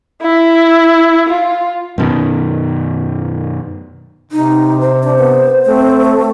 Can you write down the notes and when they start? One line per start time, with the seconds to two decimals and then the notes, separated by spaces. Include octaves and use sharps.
0.22 E4
1.28 F4
1.98 F#2 B2 D#3
4.32 C3 D#4
4.81 C5
5.03 D4
5.18 B3
5.66 A3 C4